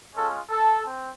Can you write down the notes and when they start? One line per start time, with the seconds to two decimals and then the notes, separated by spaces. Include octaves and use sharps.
0.15 G#3 C#4 F4 A4
0.50 A4
0.85 C4